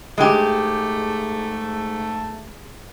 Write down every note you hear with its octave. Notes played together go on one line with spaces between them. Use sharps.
G#2 G#3 A3 G4